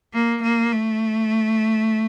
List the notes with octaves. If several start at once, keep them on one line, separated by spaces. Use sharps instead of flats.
A#3
A#3
A3